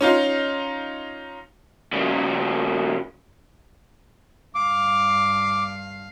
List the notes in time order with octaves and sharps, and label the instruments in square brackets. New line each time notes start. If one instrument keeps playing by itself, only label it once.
[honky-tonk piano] C#4 D#4 F4
[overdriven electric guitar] G2 C#3
[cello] G2 F5 [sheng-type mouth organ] D6